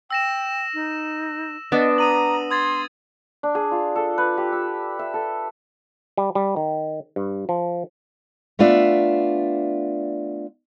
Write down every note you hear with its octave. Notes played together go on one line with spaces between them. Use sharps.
G5 E6 A#6 E7
D#4
B3 D4 D#5
A#5 D#6 D#7 F#7
C6 D#6 G#6 A6
D4
G#4
F4
A4
B4
G4
E6
E5
A4
G3
G3
D#3
G2
F3
A3 B3 D4 F4 D5 E5